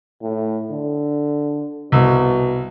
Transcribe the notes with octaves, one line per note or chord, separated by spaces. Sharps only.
A2
D3
C2 B2